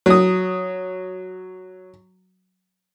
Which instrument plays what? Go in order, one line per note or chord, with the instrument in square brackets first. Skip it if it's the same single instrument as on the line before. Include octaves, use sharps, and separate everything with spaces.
[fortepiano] F#3 D#6